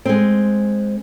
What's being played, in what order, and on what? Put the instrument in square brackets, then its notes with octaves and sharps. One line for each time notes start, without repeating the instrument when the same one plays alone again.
[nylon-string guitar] G#3 C4